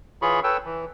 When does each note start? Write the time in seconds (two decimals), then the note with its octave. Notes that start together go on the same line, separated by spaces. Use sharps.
0.22 E3 F4 G#4 C#5 B5 C#6
0.44 A4 B4 C#5 G5 E6
0.65 E3